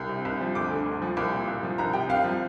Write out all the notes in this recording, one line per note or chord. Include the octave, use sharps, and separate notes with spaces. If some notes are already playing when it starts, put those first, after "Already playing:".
Already playing: C2
C3
C2
F3
D2 D6
D3
D2
F3
C2 D6
A#2
C2
F3
C2 A#5
C3 G5
C2 F5
F3